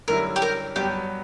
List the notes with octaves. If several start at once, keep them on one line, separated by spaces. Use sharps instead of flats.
F#2 D3 G3 C#4 E4 A#4
G4
A#4
G2 F#3 B3 G4